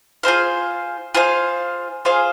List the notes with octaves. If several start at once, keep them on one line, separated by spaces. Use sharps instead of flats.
F4 G#4 C5 F5
F4 G#4 C5 F5
F4 G#4 C5 F5